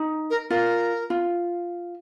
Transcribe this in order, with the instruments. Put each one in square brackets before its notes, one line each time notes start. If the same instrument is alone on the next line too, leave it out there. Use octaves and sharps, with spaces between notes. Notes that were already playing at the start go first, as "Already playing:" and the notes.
Already playing: [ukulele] D#4
[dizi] A#4
[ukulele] F4 [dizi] A#4
[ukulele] F4